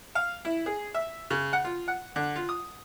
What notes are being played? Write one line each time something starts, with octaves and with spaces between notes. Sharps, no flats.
F5
E4
G#4
E5
C#3
F#5
F4
F#5
D3
F4
D#6